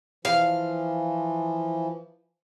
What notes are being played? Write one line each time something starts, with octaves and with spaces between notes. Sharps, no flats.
E3 F3 F5